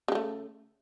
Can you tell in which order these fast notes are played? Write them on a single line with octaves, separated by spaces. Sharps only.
C#3 G#3 A3